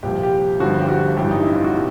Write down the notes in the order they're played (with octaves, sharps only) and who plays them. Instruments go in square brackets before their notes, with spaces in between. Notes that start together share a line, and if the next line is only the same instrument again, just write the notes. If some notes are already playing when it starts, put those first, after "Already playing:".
[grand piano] C2 A#2 F3 G4
G4
G1 G2 D3 F3 F#4
G4
F#4
A1 G2 E3 G4
D#4
E4
F4
F#4
B2 G4